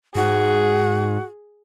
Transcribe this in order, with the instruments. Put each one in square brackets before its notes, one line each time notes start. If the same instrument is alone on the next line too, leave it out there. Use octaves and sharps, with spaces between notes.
[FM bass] G#2 [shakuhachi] F#4 [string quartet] G#4